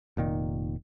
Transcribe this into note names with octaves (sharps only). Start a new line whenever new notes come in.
F1 A#2 D#3